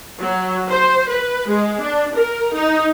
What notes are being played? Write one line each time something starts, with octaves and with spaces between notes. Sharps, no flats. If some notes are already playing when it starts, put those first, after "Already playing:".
F#3
C5
B4
G#3
D4
A#4
D#4